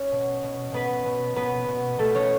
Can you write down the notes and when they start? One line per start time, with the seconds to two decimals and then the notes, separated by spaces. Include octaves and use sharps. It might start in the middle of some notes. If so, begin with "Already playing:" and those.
Already playing: C#4 C#5
0.12 B2
0.43 B2
0.72 B2 B3 B4
1.06 B2
1.36 B2 B3 B4
1.68 B2
1.99 B2 A3 A4
2.15 C#4 C#5